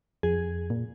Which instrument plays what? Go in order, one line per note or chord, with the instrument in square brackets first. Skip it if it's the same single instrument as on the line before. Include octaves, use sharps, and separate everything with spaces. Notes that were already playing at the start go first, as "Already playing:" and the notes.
[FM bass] F2 [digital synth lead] G#4
[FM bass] A#2